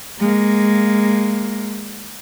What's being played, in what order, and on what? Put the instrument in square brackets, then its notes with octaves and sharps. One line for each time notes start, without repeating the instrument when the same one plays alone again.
[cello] G#3 A#3